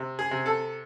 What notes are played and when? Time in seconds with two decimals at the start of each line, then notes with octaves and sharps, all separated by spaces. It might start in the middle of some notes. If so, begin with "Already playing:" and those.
Already playing: C3
0.19 G#4
0.31 C3
0.46 A4